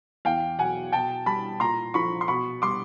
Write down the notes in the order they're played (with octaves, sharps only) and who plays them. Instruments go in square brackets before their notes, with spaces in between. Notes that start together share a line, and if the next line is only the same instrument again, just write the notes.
[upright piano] E2 F5 G5
B2 F#3 F#5 G#5
B2 G5 A5
G3 A5 B5
A#2 A#5 C6
F3 B5 C#6
C6
B2 B5 C#6
G3 C6 D6